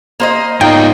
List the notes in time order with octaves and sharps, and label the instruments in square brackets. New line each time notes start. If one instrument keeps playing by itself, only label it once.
[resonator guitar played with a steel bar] A#3 C5 D#5
[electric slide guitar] G#2 F4 [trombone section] D#4 [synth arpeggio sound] G5